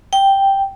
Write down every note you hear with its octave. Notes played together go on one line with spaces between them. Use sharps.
G5